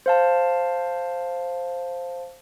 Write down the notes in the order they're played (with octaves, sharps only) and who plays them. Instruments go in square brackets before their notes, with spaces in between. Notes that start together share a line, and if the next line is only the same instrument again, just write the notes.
[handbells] C5 F5 A5